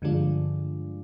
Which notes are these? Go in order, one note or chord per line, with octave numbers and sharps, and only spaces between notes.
G2 D3 F3 G#3 D4